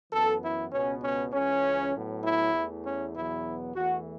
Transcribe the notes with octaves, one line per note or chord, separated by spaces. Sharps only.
F#2 E3 B3 A4
E4
C#2 B2 B3 C#4
C#4
C#2 C#3 E3 C#4
A2 F#3 B3
E4
E2 E3 A3
C#4
E2 B2 F#3 B3 E4
E2 E3 A3 F#4